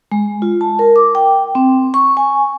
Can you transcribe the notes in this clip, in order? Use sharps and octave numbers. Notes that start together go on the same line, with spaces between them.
G#3
F4
A5
A#4
D6
G5
C4
C#6
G#5